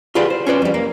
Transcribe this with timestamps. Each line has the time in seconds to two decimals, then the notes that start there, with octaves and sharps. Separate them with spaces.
0.15 F4 G4 G#4 B4 D5 F#5
0.30 C5
0.47 C#4 F4 B4 D5
0.62 F2 G3
0.74 A#3